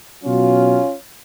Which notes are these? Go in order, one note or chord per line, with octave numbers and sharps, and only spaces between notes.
B2 F#3 C#4 F4